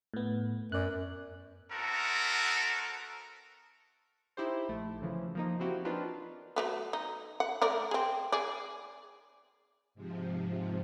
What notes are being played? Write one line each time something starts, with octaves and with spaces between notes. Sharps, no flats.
A2 B3
F#2 D5 F#6
B3 C4 E4 F#4 A4 A#4
D#4 E4 G4 C5
A#1 A3
C#3 E3 F3
F3 A#3 D#4
A#3 C4 E4 F#4 G4
A#3 C4 D4 D#4 F4 B4
F#3 A3 B3
D#4
F#5
A3 A#4 D5
C4 G#4
G#4 D5
G#2 C3 F3